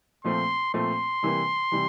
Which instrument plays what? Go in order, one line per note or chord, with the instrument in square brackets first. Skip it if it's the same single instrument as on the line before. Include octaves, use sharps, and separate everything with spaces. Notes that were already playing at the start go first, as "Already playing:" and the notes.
[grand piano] A#2 F3 A3 C4 [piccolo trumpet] C6
[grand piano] A#2 F3 A3 C4 [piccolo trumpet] C6
[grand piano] C3 E3 G3 A#3
C3 E3 G3